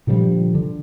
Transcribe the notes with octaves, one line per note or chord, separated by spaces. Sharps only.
A#2 D3 F3 G3
D3